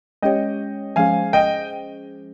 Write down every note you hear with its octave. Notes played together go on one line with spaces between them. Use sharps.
G#3 C#4 G4 C#5 D#5 G5
F3 G#3 C#4 G#4 C5 F5 G#5
D#5 G5